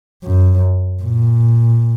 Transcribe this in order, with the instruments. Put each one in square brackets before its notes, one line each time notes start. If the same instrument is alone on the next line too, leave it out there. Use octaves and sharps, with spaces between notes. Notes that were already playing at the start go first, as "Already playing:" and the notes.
[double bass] F#2
A#2